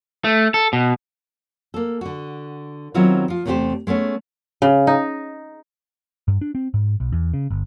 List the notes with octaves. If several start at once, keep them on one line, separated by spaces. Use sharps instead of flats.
A3
A4
B2
A#3 A4
D3 F#4
D#3 F#3 B3 C4 E4 F4
F3 F4
E2 C3 A3 F4 G4 C5
G#3 A3 B3 C#4
C#3
D#4
G2
D4
C4
G#2
B1
E2
C#3
G1